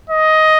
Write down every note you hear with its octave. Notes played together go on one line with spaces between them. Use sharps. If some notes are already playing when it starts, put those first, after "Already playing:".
D#5